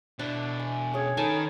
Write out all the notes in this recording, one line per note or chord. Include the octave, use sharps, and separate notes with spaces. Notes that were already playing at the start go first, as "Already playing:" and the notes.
B2 D4 E4
G#5
C#4 G#4 C#5
D#3 D#4 A4 B4 G#5 A5